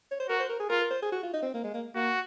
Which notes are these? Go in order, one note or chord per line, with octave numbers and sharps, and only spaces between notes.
C#5
C5
F#4 A#4
C5
A#4
G#4
F4 A#4
A#4
C5
G#4
F#4
F4
D#4
C4
A#3
G#3
A#3
A#3 F#4